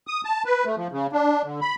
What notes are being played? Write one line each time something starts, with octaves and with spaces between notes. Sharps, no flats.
D#6
A5
B4
A3
F3
C#3
D4
D3
B5